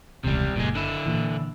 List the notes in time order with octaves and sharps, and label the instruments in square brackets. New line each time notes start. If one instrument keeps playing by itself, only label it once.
[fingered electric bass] E1 C#2 [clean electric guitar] C3 G3
[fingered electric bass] F#1 [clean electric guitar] A#2 G#3
[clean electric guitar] D3 E4
[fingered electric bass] A#2 E3